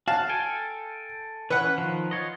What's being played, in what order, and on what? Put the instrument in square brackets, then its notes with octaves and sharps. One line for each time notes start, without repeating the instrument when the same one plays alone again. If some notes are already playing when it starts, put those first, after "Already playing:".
[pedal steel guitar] F#4 [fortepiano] F5 A5
[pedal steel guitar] A4 G5 G#5
[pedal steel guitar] E3 C#4 [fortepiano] B4 F#5
[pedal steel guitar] D#3 F3
F4 C#5 D#5